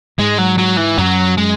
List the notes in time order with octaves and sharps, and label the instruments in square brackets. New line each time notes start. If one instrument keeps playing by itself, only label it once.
[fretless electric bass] G#2 [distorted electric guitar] G#3
[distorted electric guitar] F#3
F#3
E3
[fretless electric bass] F#2 [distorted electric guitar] F#3
[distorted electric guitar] G#3